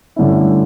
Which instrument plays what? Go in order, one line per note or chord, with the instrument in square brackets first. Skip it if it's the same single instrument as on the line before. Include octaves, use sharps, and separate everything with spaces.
[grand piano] G2 D3 A3 C#4 E4